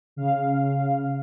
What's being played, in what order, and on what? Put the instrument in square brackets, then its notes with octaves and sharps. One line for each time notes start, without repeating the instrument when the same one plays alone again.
[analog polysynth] C#3 F5